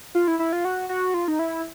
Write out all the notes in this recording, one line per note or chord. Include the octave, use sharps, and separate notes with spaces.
F4
E4
E4
F4
F#4
F#4
F4
D#4
E4